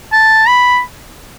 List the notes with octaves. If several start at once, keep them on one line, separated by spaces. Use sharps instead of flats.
A5
B5